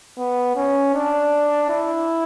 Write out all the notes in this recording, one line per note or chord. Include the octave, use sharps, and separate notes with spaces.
B3
C#4
D4
E4